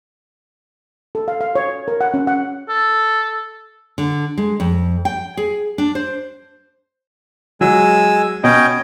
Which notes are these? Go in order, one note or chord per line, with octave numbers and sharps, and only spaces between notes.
A4
F5
F5
C#5
A#4
F#5
C#4
F#5
A4
D3
G#3
F2
G5
G#4
D4
C5
F#3 G#3 G#5 E6
B2 C#4 D#5 G5